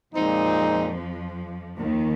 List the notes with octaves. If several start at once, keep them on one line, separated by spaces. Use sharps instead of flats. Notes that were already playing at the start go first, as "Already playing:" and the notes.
F2 A#2 F3 G#3 C4 D#4
D#2 D#3